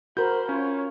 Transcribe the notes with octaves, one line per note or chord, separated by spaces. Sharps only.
F#4 A#4 C5 B5 G6
C#4 F4 C#5